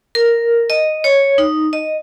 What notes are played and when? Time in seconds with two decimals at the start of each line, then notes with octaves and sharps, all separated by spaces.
0.15 A#4
0.70 D#5
1.04 C#5
1.38 D#4
1.73 D#5